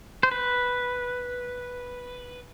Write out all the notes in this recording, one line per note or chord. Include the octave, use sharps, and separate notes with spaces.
C5
B4